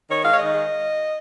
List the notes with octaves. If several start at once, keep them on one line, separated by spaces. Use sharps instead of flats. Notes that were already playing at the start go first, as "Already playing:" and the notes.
D#3 C#5
G#3 F5
C#5
D#3 D#5
G#3